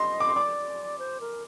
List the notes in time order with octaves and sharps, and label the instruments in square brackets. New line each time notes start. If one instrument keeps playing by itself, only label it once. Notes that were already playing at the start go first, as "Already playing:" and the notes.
Already playing: [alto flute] D#5 [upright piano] C6
[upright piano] D6
C6
[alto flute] D5 [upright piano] D6
[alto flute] C5
A#4